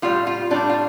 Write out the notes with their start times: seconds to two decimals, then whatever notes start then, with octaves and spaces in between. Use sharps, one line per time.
0.02 A2 G3 F4
0.27 F4
0.50 A2 G3 D4
0.70 F4